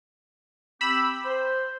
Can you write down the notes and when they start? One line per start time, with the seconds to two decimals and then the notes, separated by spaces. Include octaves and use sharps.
0.81 C4 G4 B5 E6
1.24 C5